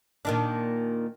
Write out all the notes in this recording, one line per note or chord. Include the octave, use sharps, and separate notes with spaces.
A#2 D#3 D4